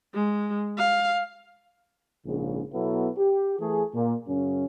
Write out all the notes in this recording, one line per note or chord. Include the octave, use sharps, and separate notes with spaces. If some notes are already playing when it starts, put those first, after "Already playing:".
G#3
F5
A#1 G#2 C#3
B2 F#3 B3 E4 A4
G4
E3 A3 G#4
A#2
F#2 C#3 C#4